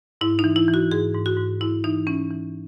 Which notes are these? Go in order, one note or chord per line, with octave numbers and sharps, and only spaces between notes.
G#2 E4
D#4
E3
E4
E3
F#4
G#2 G#4
G#2
F#4
G#2
G#2 E4
E3 D#4
E3 C#4
E3